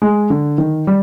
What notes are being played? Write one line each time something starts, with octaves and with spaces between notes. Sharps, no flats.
G#3
D3
D#3
G3